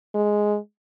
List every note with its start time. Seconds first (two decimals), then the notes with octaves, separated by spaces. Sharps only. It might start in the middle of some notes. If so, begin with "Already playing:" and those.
0.15 G#3